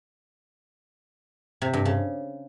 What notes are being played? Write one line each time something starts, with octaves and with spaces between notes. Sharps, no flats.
C3
G2
C#3